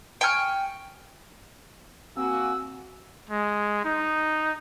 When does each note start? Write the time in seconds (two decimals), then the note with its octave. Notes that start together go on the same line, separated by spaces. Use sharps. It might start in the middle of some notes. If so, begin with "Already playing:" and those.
0.21 G5 G#5 C#6 F6
2.17 A#3 C4 F#4 G#5 E6
3.30 G#3
3.84 D#4